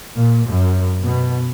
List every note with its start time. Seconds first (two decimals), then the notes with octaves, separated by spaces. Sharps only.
0.14 A#2
0.46 F#2
1.03 B2